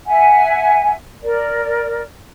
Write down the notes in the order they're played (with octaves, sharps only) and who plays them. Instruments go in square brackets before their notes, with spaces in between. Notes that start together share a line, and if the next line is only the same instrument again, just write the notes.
[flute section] E5 F#5 G#5
A#4 D5